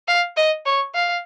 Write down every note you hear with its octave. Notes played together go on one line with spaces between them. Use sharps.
F5
D#5
C#5
F5